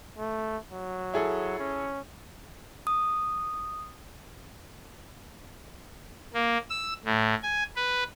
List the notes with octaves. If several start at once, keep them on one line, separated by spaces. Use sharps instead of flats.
A3
F#3
E4 G#4 A4
C#4
D#6
A#3
E6
A2
G#5
B4